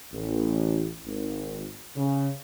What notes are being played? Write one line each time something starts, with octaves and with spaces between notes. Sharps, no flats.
A1
G#1
C#3